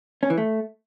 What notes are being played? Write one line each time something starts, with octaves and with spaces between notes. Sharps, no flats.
C#4
E3
A3